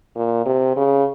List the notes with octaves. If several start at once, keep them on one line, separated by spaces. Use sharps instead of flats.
A#2
C3
C#3